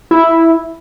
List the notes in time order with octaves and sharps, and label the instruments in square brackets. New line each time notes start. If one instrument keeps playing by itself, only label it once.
[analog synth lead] E4